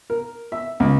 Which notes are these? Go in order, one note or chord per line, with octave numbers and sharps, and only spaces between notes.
A#4
E5
C#2